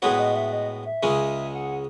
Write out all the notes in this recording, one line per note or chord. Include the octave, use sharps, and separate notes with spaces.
A2 G#3 B3 F#4 C#5
D#5
E5
D#5
E5
C#2 C#3 G#3 C#4
F#5